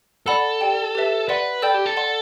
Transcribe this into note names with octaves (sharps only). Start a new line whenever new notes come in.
A4 D5 F#5 B5 E6
G4 D5 G5
G4 B4 E5
B4 D5 F#5 C6
A4 D5 G5 B5 E6 G6
G4
A4
D5 F#5 A5 C6